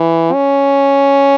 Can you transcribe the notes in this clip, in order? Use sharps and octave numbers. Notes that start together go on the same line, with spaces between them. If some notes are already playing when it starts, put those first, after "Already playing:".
Already playing: E3
C#4